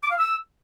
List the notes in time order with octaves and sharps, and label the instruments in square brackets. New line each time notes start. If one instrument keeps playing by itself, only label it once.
[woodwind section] D6
F5
E6